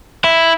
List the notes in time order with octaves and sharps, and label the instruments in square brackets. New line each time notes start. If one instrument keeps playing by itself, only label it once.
[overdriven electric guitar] E4